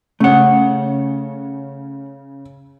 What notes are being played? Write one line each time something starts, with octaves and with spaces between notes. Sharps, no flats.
C#3 A3 C#4 F#5